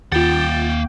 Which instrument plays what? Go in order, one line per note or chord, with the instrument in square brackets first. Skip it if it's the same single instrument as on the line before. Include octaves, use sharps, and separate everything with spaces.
[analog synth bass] D#2 [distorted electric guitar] A#3 F#5 [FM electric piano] F4 A6 [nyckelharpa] G5